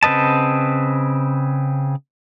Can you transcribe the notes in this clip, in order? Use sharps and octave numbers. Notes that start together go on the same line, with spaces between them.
C#3 C4 B4 D#5 A5